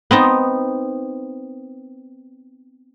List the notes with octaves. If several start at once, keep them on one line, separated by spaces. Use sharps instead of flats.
B3 C4 D#4